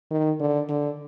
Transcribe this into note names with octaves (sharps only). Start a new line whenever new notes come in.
D#3
D3
D3